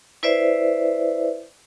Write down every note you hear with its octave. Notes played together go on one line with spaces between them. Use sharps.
E4 B4 C5 D5 E5